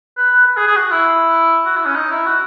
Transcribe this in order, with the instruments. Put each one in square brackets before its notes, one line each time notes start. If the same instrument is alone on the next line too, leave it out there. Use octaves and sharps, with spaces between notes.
[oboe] B4
B4
G#4
G#4
F#4
E4
F#4
E4
C#4
D#4
E4
F#4